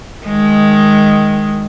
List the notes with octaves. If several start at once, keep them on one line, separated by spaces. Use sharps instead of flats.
D#3 G#3